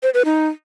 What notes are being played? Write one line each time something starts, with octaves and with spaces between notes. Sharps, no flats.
C5
B4
D#4